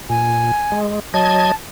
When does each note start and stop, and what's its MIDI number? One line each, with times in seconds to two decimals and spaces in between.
0.10 0.52 46
0.10 0.80 80
0.72 1.00 56
1.14 1.52 54
1.14 1.52 75
1.14 1.54 81
1.14 1.52 92